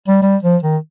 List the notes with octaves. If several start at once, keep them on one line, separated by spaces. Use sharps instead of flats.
G3
G3
F3
D#3